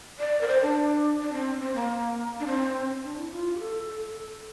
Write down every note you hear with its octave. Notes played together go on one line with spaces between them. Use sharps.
D5
A#4
C5
D4
D4
C4
C4
A#3
D4
C4
D4
E4
F4
G4
A4
A4